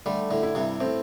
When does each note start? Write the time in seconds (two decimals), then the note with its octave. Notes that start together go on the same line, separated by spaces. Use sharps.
0.06 D3 G3 A3
0.31 A2 D3
0.43 E4
0.55 G2 C3
0.80 A2 C4